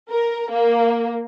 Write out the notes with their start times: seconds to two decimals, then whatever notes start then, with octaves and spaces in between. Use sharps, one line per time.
0.10 A#4
0.52 A#3